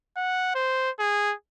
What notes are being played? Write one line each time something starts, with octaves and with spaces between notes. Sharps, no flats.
F#5
C5
G#4